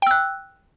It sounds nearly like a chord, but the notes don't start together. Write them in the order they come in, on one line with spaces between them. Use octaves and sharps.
G5 E6 F#6